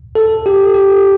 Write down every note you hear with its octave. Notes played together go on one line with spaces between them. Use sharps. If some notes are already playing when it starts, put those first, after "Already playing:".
A4
G4
G4